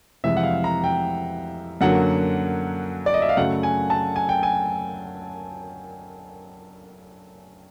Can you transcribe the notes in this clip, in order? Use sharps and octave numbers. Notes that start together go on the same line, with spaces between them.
F2 C3 E3 G#3 E5
F#5
F5
A#5
G5
F#2 D3 F#3 A#3 F#5
D5
D#5
E5
F5
F#2 C#3 F#3 A3 F#5
G#5
A5
G#5
G5
G#5